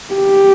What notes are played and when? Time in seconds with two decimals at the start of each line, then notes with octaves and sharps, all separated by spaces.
0.14 G4